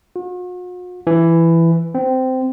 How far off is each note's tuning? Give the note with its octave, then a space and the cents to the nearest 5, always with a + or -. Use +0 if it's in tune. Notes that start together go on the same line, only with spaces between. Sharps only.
F#4 -45
E3 +10
C4 -15